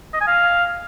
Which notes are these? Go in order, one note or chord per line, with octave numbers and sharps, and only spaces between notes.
D#5
G#5
F5